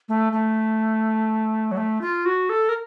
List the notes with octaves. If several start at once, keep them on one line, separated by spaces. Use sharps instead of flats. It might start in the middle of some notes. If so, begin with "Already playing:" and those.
A3
A3
F#3
A3
F4
F#4
A4
A#4